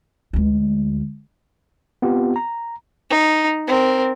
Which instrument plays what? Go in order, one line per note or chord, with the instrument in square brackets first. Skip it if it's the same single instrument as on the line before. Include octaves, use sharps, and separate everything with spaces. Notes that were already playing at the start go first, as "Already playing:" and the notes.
[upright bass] D2 G#3
[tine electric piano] B3 C4 F4 G4
A#5
[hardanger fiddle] D#4
C4 A#4